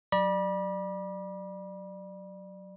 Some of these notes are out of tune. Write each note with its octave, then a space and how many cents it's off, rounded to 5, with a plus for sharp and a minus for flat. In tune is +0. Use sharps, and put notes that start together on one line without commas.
F#3 +0 D5 +20 B5 -35